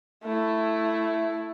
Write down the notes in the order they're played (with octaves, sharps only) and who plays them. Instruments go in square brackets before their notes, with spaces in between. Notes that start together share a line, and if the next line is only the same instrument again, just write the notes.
[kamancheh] A3 E4